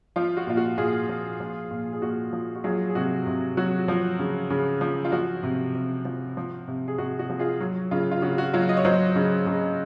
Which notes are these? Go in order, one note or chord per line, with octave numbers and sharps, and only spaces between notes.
F3 F4
F#4
A#2 F4
F#4
A#2 F4 G#4
F3
F3
A#2
G#4
A#2 F#4
F3
F#4
F#3 F4 G#4
G#4
C3 F#4
C3
F#3 F#4
F3
C#3
C#3
F3
F4
F3 F#4
C3
C3
F3
F3
C3
G#4
C3 F#4
F#4
F3
F4 G#4
F#3
C#3 F4
F4
C#3 F#4
F#4
F#3 F4
D#5
C#5
F#3 C5 D#5
C#3
C#3